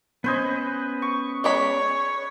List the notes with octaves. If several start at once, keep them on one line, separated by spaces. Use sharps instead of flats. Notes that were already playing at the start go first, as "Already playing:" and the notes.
B3 C#4 B4 C5 D#5 G#5
C#6
G#3 C#5 D5 B5